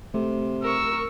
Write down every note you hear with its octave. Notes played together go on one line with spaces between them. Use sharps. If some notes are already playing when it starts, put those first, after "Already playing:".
C3 A3
A#4 C#6 E6